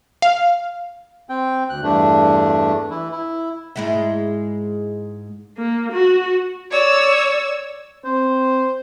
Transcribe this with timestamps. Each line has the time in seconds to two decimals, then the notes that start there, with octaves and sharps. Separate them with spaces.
0.22 F5
1.29 C4 G5
1.70 D2 F#6
1.83 E2 G2 A3 D4
2.90 E3 E4
3.12 E4
3.76 G#2 G#3 E4
5.57 A#3
5.92 F#4
6.71 C#5 D5 E6
8.05 C4 C5